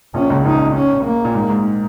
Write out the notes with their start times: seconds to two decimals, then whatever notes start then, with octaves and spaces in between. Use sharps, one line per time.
0.14 A#1 A#2 C#4
0.30 C#2 C#3
0.44 A#1 A#2 D#4
0.75 C#4
1.04 A#3
1.25 A#2
1.35 G#2
1.50 G#2